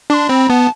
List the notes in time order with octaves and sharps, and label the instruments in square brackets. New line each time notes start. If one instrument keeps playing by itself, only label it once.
[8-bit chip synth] D4 [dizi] D6
[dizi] C6
[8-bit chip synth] C4 [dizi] B5
[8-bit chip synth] B3 [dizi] A5